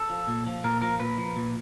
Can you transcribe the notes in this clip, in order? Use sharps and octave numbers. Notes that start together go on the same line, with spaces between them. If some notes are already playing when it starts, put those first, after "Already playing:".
Already playing: A4
F3
A#2
F3
A#2 A#4
F3 A#4
A#2 B4
F3
A#2